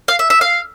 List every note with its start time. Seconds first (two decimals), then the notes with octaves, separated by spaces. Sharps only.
0.08 F5
0.19 E5
0.30 E5
0.41 F5